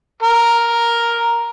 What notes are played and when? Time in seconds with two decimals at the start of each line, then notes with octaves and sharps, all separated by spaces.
0.23 A#4